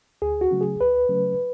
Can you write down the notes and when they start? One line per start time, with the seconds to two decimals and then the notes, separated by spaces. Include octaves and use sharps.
0.22 D2 G#4
0.41 F#4
0.51 C#3 F#3 A3 C#4
0.61 G#4
0.80 D2 B4
1.09 C#3 F#3 A3 C#4